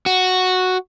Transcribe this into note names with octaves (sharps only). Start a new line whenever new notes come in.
F#4